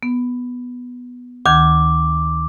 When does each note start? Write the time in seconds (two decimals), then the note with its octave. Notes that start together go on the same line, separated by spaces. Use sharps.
0.03 B3
1.46 D2 D#3 D6 G#6